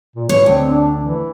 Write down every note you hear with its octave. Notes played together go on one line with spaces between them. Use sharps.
A#2
E3 C#5
D2 C4
D4
E3